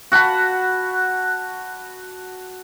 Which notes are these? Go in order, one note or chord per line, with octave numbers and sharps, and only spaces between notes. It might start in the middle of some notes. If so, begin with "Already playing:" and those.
F#4 F#5 A5 B5